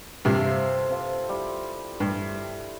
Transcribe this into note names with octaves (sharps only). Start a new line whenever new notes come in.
G2 C3 A4 E5
F4 C5
C4 F4
G3 E4
G2